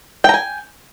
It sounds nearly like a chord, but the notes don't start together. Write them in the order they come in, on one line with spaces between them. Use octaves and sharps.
G5 A#5 G#5